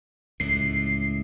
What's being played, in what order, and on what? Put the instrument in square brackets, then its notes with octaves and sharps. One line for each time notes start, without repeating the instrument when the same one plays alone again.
[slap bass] C#2 A2 [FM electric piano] C7